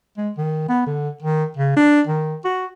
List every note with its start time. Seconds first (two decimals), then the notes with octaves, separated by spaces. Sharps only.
0.17 G#3
0.37 D#3
0.69 B3
0.86 D3
1.22 D#3
1.57 C#3
1.76 D4
2.07 D#3
2.45 F#4